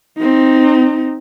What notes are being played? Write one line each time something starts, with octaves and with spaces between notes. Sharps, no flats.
C4 D#4